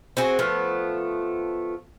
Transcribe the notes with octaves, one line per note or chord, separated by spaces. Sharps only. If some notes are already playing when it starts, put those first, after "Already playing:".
C4 F#4 G#4
F3 A3 B3